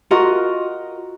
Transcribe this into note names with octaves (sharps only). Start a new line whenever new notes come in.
F4 F#4 A#4 D#5